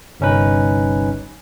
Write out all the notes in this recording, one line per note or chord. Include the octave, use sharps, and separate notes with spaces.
G1 C2 C#4 D#4 B4